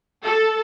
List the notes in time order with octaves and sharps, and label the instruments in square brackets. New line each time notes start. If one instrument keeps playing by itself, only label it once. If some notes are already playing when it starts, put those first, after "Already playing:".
[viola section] A4